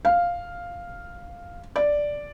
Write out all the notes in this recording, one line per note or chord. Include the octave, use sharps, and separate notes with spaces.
F5
D5